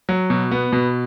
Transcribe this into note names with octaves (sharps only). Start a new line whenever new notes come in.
F#3
B2
B3
B2